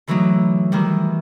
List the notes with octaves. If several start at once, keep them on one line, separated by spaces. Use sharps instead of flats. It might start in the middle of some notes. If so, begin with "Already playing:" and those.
D3 E3 F#3 A3 D#4
D#3 E3 G3